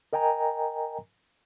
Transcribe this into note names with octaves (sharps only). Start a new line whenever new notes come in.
A#4 D#5 G5 G#5 A#5